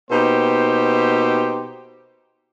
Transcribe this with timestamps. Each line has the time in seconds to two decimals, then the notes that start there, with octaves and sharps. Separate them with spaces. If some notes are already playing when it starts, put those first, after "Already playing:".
0.11 B2 A#3 D#4 G4 C5